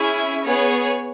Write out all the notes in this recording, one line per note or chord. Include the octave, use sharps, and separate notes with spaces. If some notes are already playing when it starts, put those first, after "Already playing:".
Already playing: C#4 E4 G#4 E5
B3 G#4 C#5